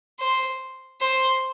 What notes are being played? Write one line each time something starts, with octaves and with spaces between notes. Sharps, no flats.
C5
C5